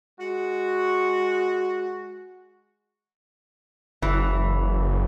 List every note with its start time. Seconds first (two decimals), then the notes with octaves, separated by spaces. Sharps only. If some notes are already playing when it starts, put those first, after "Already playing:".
0.20 G#3 F#4
4.02 F#1 E3